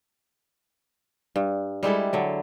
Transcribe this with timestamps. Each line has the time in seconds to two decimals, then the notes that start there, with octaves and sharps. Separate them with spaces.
1.36 G2
1.83 G3 G#3 E4 A4
2.13 D3 F#3